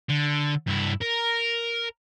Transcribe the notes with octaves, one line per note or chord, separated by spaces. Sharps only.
D3
G2 E4
A#4